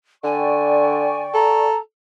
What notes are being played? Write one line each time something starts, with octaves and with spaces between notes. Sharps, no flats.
D3 D5 G5 G#5 C#6
A4 A#5